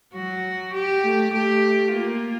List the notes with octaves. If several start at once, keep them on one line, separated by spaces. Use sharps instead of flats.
F#3 F#4
G4
A3
A3 G4
A#3 F4